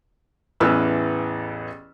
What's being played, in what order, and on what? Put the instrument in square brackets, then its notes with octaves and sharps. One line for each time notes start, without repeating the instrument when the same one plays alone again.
[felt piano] A1 E2 E3 B4 E6 F6